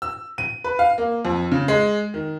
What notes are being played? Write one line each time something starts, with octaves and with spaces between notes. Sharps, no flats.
E6
D#7
B4
F5
A#3
F2
C#3
G#3
D#3